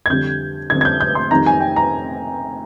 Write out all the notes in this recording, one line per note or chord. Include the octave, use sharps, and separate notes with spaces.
G#6
F2 D3 G3 G6
F2 D3 G3 G#6
G#6
G6
G6
C6
F2 D#3 G3 A#5
G#5
G5
A#5